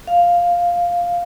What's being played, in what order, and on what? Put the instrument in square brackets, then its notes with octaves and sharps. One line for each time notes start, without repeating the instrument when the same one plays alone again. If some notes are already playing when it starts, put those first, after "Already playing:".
[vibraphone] F5